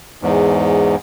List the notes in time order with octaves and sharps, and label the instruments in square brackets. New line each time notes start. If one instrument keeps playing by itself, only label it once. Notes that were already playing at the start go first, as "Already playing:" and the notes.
[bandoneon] E2 G#2